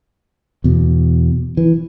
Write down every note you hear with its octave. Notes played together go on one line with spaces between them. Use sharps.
E2 B2
E3